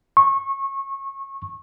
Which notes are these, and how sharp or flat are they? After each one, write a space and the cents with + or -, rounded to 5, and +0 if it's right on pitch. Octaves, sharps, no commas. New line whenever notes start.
C#6 -25